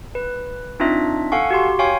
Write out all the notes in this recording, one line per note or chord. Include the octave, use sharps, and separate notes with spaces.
B4
C4 D4 D#4 F4 E5
A4 F5 F#5 G#5 C#6
F#4 G4 C6
C#5 F5 G5 G#5 C6 C#6